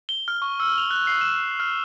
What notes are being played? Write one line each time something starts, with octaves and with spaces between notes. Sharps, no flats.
G7
F6
C#6
E6
F7
F#6
C7
E7
F6